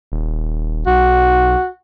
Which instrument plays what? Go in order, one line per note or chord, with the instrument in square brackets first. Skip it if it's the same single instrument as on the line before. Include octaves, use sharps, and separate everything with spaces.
[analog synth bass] D#1
[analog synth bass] B1 [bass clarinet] F#4